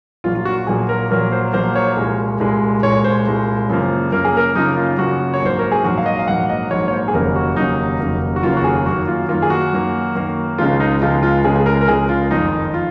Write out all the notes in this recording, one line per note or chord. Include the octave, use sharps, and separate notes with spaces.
A#1 A#2 F#3 A#3 F4
F4
F#4
A#1 A#2 F#3 A#3 G#4
A#4
A#1 A#2 F#3 A#3 A#4
C5
A#1 A#2 F#3 A#3 C5
C#5
C2 A#2 G#3
C2 A#2 G#3
C2 A#2 G#3 C#5
C5
C2 A#2 G#3
F#2 C#3 F3 A#3
F#2 C#3 F3 A#3 A#4
G#4
A#4
F#2 C#3 F3 A#3 D#4
F4
F#2 C#3 F3 A#3 F#4
C#5
A#1 G#2 F#3 A#3 C5
A#4
G#4
A#1 G#2 F#3 A#3 F#4
F5
D#5
F5
A#1 G#2 F#3 A#3 F#5
D#5
A#1 G#2 F#3 A#3 C#5
C#5
C5
G#4
F1 D#2 C#3 F#3 A#3 A#4
F#4
F1 D#2 C#3 F#3 A#3 D#4
F1 D#2 C#3 F#3 A#3
F#4
F1 D#2 C#3 F#3 A#3 F4
F#4
G#4
F#2 D#3 A#3 F#4
F4
F#2 D#3 A#3 F4
G#4
F#4
F#2 D#3 A#3
F#2 D#3 A#3
C#2 C#3 F3 G#3 F4
D#4
C#2 C#3 F3 G#3 F4
F4
C#2 C#3 F3 G#3 G#4
G#4
A#4
A#4
C#2 C#3 F3 G#3 G#4
F4
F#1 F2 D#3 D#4
F4